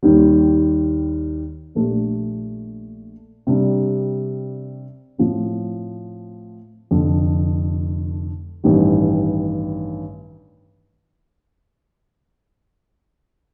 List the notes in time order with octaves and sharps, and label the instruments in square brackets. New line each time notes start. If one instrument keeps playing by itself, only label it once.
[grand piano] D#2 D#3 G3
A#1 A#2 A3 D4 G4
C3 G3 D4
A2 F3 C4
F1 F2 D3
A1 G2 D#3 G3